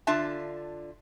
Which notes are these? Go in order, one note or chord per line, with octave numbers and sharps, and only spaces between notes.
D3 D4 F4 E5 A5